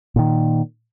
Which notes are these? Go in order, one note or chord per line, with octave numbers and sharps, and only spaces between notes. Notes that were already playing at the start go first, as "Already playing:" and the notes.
A#2 D#3